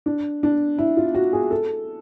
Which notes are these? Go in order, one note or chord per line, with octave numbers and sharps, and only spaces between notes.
D4
D4
E4
F4
F#4
G#4
A4